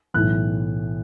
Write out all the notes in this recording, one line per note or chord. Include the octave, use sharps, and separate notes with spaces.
B1 A2 E3 F#6